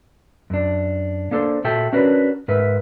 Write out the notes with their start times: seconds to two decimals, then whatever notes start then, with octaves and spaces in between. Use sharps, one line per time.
0.50 F#2 D4
1.31 A#3 D4 A4 C5
1.64 A#2 F#4 A4 E5 G5 A5
1.93 C#4 D4 F#4 A#4 B4
2.48 G#2 A#4 B4 E5